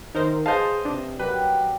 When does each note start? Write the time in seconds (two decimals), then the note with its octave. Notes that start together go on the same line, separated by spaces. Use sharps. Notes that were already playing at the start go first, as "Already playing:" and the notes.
0.15 D#3 D#4 A#4 C5 E5
0.46 G#4 B4 C5 D#5 F5 A5
0.85 C3 D4
1.19 F#3 G3 A#4 B4